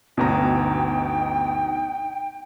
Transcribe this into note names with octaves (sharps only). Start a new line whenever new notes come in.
G1 D2 B2 D#4 G5 A#5